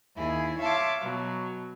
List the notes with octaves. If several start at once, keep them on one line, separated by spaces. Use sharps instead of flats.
D#2 E4 G#4
C#5 E5 F5 A5 C6 D6
B2 F#3